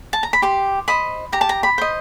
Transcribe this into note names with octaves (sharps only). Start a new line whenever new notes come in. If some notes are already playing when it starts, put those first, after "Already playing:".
A5
A#5
B5
G4 C6
C5 D#5 B5
G4 A#5
A5
A#5
B5
C5 D#5